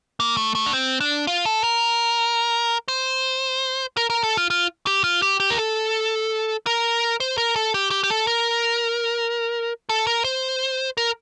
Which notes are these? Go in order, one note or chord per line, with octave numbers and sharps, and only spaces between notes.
A#3
A3
A3
D4
C4
D4
F4
A4
A#4
C5
A#4
A#4
A4
F4
F4
G4
F4
G4
G4
A#4
A4
A#4
C5
A#4
A4
G4
G4
G4
A4
A#4
A4
A#4
C5
A#4